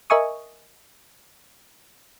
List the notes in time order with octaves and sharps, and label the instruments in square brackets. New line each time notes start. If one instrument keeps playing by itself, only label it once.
[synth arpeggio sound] A#4 D#5 E5 G#5 C#6 D#6